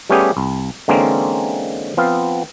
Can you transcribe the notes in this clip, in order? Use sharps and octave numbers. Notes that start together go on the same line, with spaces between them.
G3 A3 B3 C#4 G4 G#4
C2
D3 E3 G#3 A#3 C4 C#4
F3 B3 C4 F5